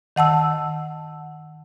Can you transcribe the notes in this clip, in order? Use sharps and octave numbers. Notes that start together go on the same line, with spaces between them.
D#3 F#5 A5 E6